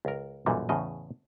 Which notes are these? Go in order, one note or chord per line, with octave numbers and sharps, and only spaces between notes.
C#2 A#4
B1 F#2 A#2 E3 G3
E2 A2 C#3 D#5